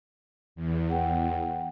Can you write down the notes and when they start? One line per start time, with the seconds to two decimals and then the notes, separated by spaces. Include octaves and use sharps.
0.56 E2
0.90 F#5 G5